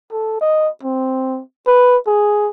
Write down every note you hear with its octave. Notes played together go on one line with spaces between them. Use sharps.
A4
D#5
C4
B4
G#4